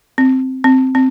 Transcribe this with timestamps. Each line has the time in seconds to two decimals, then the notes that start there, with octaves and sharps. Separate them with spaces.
0.18 C4
0.64 C4
0.95 C4